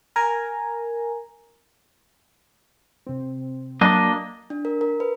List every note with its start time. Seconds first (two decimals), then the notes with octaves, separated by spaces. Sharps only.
0.16 A#4 G#5 A#5
3.06 C3 C4
3.81 F#3 A#3 D4 D#5
4.50 D4
4.65 A#4
4.81 A#4
5.00 B4